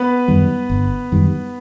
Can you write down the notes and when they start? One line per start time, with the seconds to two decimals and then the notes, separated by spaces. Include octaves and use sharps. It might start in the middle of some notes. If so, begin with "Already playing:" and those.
Already playing: B3 B4
0.28 F#2 D#3 G3
0.70 G1
1.12 F#2 D#3 G3